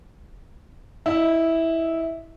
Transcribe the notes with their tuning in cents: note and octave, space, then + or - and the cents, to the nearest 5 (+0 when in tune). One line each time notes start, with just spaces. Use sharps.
E4 -10 D#5 +0